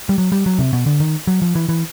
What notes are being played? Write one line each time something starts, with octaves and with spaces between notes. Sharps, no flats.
G3
F#3
G3
F#3
C3
B2
D3
D#3
F#3
F3
E3
E3